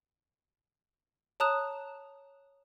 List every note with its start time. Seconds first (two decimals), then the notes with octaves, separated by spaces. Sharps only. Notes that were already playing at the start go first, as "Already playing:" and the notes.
1.40 C#5 A5 A#5 D#6 F#6 E7